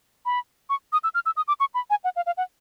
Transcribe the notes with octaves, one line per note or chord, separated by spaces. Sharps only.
B5
C#6
D#6
E6
F6
E6
D#6
D6
C#6
B5
G#5
F#5
F5
F5
F#5